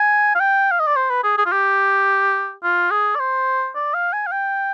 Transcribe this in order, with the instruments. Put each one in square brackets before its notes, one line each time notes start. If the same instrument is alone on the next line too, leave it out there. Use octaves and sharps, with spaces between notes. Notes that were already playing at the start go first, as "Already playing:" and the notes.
Already playing: [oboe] G#5
F5
G5
F5
D#5
D5
C5
B4
G#4
G#4
F4
G4
F4
G#4
D5
C5
D5
F5
G#5
F5
G5